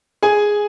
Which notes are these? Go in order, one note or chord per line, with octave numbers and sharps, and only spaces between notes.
G#4 G#5